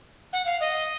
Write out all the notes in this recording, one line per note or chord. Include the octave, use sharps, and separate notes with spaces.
F#5
F5
D#5